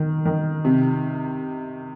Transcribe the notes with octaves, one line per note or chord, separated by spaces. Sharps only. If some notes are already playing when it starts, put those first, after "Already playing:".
Already playing: D#3
D#3
C3